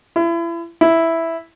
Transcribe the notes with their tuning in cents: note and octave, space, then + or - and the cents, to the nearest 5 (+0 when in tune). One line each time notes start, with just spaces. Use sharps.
E4 +35
E4 +0